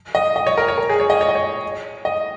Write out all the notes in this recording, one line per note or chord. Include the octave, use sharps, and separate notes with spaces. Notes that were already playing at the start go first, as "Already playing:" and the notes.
D#5
D#5
C#5
A#4
C#5
A#4
G#4
C#5
D#5
C#5
D#5
C#5
D#5